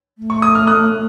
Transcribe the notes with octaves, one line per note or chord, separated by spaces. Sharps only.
A3
C#6
D#6
F6
D#6 F#6